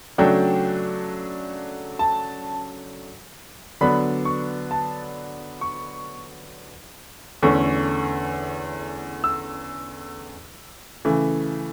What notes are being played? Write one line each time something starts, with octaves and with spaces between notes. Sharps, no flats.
C#3 F#3 A3 D4 G5
A5
D3 F#3 B3 D4 B5
C#6
A5
C#6
E2 D3 A3 C#4 C#6
E6
C#3 E3 A3